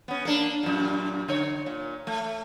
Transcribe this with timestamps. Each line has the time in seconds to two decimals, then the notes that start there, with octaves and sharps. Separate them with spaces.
0.08 B3 C#4
0.25 A#3 D4
0.63 F#2 A#2
1.28 D3 C#5
1.66 A#2
2.07 A3